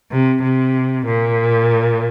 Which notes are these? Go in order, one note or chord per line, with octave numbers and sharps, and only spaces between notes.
C3
C3
A#2